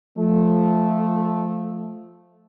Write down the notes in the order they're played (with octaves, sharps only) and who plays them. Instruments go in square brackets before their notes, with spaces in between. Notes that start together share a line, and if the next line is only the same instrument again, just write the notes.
[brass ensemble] F3 A3